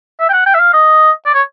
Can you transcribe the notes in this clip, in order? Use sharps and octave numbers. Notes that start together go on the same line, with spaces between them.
E5
G5
F#5
G5
E5
F5
D#5
D5
C#5